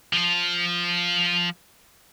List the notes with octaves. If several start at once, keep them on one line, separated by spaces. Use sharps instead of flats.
F3 F4